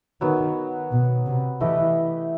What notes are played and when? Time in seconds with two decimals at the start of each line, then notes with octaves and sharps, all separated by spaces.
0.21 D#3 F#3 B3 F#4
0.91 B2
1.26 C3
1.60 E3 A3 E4 G4 D#5